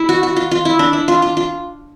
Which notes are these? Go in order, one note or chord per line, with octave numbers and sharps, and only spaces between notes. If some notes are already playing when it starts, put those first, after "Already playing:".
Already playing: E4
F#4
F#4
F4
F4
E4
D4
E4
F4
F4
F4